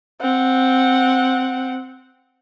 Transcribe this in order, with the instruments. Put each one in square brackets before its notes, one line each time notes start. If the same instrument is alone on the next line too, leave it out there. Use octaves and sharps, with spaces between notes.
[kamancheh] C4 F#5